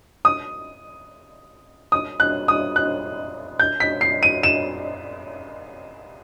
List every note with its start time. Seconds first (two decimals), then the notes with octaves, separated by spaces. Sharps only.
0.25 D#6
1.92 D#6
2.20 F#6
2.48 D#6
2.76 F#6
3.60 G6
3.80 B6
4.01 C7
4.23 D#7
4.43 E7